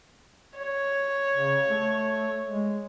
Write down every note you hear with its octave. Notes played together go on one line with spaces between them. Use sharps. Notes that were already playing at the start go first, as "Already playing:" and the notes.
C#5
C#3
A3
G#3